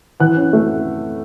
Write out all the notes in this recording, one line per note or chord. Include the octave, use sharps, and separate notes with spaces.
E3 F#5 F#6
C#4
A3